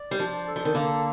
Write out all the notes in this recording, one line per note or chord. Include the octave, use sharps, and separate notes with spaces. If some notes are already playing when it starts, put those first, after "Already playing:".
Already playing: D5
G3
F3 D4
A4
F3
D#3
D3 A#3